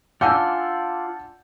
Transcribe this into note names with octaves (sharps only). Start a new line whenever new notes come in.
D4 F4 D5 F#5 G#5 A5 E6 G6